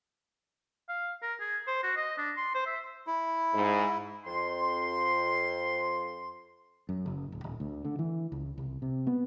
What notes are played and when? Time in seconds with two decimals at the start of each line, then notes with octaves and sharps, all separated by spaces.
0.89 F5
1.22 A#4
1.40 G#4
1.67 C5
1.83 F#4
1.96 D#5
2.18 D4
2.37 C6
2.55 C5
2.66 E5
3.07 E4
3.54 G#2
4.25 F2 C6
6.89 F#2
7.06 F#1
7.32 D1
7.44 D#1
7.60 D2
7.85 D3
7.99 E3
8.32 C#2
8.58 C2
8.82 C3
9.07 B3